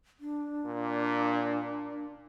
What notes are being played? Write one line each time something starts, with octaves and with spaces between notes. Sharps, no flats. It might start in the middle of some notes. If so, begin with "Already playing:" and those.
D4
A#2